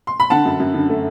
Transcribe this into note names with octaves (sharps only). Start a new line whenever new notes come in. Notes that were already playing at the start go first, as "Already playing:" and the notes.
C6
B5
D3 F#5 A5
F#2
F#2
D3
A3